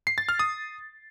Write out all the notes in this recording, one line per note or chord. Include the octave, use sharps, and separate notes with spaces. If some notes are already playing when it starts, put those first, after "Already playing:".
C7
A6
F6
D#6